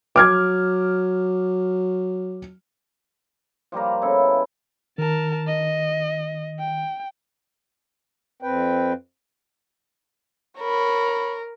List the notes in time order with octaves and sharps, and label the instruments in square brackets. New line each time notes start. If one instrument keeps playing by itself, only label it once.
[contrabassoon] F#3 [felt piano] D6 F6 G#6
[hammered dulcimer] F3 G3 A#3 A#4
C#3 B3 E4 A4
[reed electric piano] D#3 [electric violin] A#4 A5
[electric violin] D#5
G5
[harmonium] F2 C4 B4 G5
[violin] A#4 [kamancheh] C#5 B5